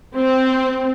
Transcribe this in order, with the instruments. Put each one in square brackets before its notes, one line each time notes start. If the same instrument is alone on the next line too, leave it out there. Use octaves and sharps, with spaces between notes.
[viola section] C4